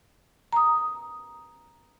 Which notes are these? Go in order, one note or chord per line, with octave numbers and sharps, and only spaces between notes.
A#5 D#6